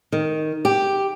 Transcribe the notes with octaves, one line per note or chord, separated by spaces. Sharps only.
D#3
G4